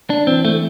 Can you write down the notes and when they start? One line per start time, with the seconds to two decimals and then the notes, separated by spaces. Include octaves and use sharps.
0.10 D4
0.27 E3 C4
0.45 A3